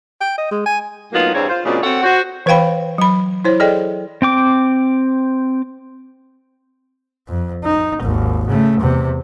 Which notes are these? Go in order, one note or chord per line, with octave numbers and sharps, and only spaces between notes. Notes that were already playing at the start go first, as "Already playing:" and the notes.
G5
D#5
G#3
G#5
A2 F#3 A#3 B3 D#4 F4
E2 G2 G3 C4 C#5
F4 C5
F#2 A#2 C#3 G#3 C4 D4
B2 C4 A4 C#5 F#5
F#4 C5
E3 B4 C5 F5 G5 B5
F#3 B5
E4 C5 C#5
G#4 A4 D5 D#5 G5
C4 G5 D6
F2
D#4
G#1 D#2
C#3 A3
E2 C3